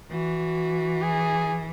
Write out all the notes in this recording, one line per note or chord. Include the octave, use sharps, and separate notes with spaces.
E3 F#4
G#4